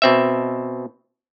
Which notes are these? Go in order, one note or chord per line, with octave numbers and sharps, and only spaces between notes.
B2 C4 E5